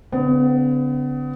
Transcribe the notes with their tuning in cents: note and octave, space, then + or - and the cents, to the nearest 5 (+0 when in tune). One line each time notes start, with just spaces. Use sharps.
D3 -35 B3 +35